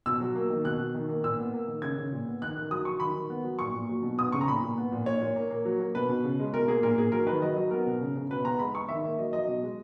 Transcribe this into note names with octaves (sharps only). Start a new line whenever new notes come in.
B2 E6
F#3
A#3
D#3
B2 F#6
B2
D#3
A#3
A#2 E6
B3
A#3
D#3
C#3 G#6
C#3
A#2
B3
D#3 F#6
D#3 F#6
F#3 D#6
F#3 C#6
D#3 B5
D#3
B3
F#3
A#2 C#6
A#2
F#3
B2
B3 D#6
C#3 C#6
A#5
A#2 B5
A#2
B3
A#2
A#2 C#5
A#2
A#3
A#3
F#3
A#3
B2 B4
B2
C#3
G#3
B2 A#4
A#3 G#4
A#2 A#4
A#2 G#4
F#3 A#4
D#3 B4
F#3 D#5
F#3
B3 A#4
B2
C#3
C#3
B2 B4
B3 A#5
G#3 B5
G#3 C#6
D#3 E5
A#3
F#3 D#5
F#3 D#5
B2
G#3